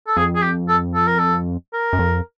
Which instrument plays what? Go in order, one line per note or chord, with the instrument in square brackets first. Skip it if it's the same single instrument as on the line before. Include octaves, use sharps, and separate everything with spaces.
[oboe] A4
[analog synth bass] F2 [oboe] G#4
[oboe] G#4
G4
A4
A4
A#4
A4
A#4
[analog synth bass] F#2
F2